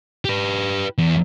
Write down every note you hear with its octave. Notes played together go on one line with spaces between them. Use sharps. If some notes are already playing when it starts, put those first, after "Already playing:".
G4 B4
E2